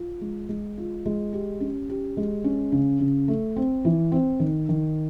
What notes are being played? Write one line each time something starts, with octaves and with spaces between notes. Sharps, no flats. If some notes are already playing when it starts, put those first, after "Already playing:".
Already playing: F4
G#3
G#3
F4
G#3
G4
C#4
G4
G#3
C#4
C#3
C#3
A3
C4
E3
C4
D#3
D#3